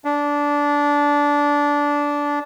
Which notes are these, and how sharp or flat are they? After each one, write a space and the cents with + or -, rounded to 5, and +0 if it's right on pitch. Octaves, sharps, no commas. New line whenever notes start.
D4 -15